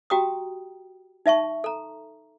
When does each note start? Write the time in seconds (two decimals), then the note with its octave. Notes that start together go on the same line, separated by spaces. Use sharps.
0.10 F#4 G4 G5 A#5 D#6
1.26 D#4 E5 A5 C#6
1.64 A4 A#5